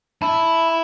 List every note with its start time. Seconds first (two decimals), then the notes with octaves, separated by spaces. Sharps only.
0.22 E4 A5
0.68 B5